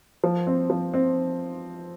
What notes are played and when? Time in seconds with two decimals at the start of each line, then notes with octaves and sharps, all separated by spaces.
0.24 F3
0.47 C4
0.70 F3
0.94 C4